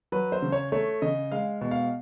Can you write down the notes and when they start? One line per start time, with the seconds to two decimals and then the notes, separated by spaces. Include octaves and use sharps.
0.12 F#3 B4
0.32 C5
0.42 C#3
0.52 C#5
0.72 A3 C#5
1.02 C#3 D#5
1.32 G#3 F5
1.61 B2
1.71 F5